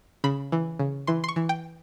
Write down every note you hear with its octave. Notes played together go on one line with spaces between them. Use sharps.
C#3 B5
E3
C#3
E3 C6
C6
C#6
E3
G5